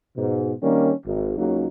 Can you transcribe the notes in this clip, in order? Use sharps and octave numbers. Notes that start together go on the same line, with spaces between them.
G#2 B2
D#3 G3 A#3 C#4 D4
G#1
C#2 C#3 F#3 A#3 D#4